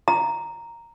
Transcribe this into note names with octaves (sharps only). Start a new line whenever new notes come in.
A#5